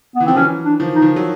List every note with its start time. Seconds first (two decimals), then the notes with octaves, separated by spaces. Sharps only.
0.15 B3
0.20 E3
0.26 F3 C4
0.36 E3 F#3 C#4
0.65 D4
0.80 D#3 F3
0.95 D#4
1.02 D#3 F3
1.16 F#3